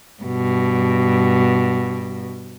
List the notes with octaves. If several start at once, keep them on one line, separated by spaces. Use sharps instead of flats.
G2 B2